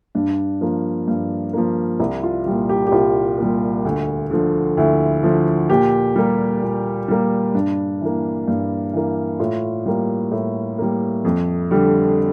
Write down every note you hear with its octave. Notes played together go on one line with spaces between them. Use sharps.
G2 D4
F3 A#3
G2
F3 A#3
C2 E4
F4
A#2 G3
G4
G4
C2 F4
A#2 G3
D2
D3 F3
D2 E4
D3 F3
A#2 G4
G3 A#3
A#2
G3 A#3
G2 D4
E3 A#3
G2
E3 A#3
A2 F4
G3 A#3
A2
G3 A#3
F2
D3 G3